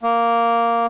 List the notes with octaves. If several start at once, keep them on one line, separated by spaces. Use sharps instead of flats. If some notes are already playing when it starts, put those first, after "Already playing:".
A#3